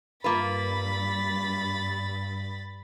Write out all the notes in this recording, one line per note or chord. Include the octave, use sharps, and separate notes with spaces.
G2 A#3 F4 B4 B5 A6